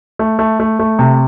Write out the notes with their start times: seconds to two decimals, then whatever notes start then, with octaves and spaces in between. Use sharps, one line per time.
0.19 A3
0.39 A3
0.60 A3
0.79 A3
0.99 C3